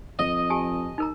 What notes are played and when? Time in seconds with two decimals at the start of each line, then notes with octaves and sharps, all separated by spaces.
0.19 F2 D#5
0.50 G4 G#5 A5
0.98 D#4 A#4 A#5